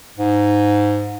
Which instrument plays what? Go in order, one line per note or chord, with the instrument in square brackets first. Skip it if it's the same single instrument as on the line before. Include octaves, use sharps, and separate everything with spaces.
[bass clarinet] G#2